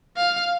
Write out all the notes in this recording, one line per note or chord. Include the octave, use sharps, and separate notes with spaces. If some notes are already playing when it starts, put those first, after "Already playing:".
F5